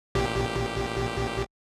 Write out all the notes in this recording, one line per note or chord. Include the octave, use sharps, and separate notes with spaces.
A1 A#2 G4